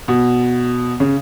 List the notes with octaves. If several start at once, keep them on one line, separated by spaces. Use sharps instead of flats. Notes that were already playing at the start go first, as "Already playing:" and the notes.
B2
C#3